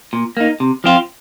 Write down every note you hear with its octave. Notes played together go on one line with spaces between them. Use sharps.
A#2
A#3 D#4
C3
F3 C4 F4